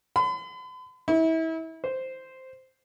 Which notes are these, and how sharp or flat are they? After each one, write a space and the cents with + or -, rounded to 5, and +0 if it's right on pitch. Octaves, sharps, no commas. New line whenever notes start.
B5 +45
E4 -30
C5 -5